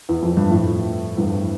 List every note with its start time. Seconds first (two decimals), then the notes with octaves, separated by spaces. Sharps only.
0.09 E2
0.23 F2
0.37 G2
0.50 F2 A2
1.17 E2 G2